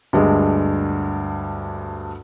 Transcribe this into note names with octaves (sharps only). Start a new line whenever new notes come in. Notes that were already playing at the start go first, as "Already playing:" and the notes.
D2 G2 G#3